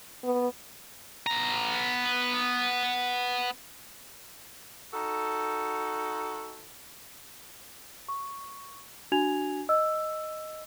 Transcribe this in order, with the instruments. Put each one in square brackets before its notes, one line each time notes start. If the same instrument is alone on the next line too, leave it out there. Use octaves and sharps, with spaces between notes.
[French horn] B3
[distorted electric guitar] B3 A#5
[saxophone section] D#4 F#4 A4
[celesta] C#6
D4 F#4 G#5 G#6 F7
D#5 E6